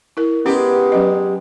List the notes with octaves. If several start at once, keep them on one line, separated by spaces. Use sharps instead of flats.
E4 A#4
G#3 B3 C#4 G4 F#5
F#3 C#4 D#5